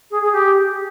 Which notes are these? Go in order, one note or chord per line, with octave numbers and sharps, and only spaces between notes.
G#4
G#4
G4